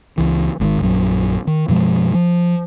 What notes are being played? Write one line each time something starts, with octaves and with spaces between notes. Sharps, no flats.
C#2 E3
G#1 G#2 C3 D#3
A#1 F#2 F#3
D#3
F#2 B2 F3 G#3
F3